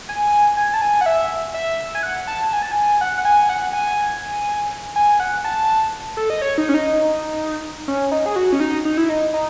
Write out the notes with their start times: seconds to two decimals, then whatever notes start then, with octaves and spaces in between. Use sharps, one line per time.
0.09 G#5
0.57 G#5
0.74 A5
0.81 G#5
1.01 F#5
1.06 E5
1.54 E5
1.95 G#5
2.03 F#5
2.27 A5
2.53 G#5
2.62 A5
2.71 G#5
3.01 F#5
3.18 F#5
3.25 G#5
3.42 G#5
3.49 F#5
3.73 G#5
4.96 G#5
5.20 F#5
5.44 A5
6.17 A4
6.30 D#5
6.42 C#5
6.58 D#4
6.69 C#4
6.74 D#4
7.88 C#4
8.12 D#4
8.26 G#4
8.36 F#4
8.53 C#4
8.60 D#4
8.85 D#4
8.97 E4
9.09 D#4
9.34 D#4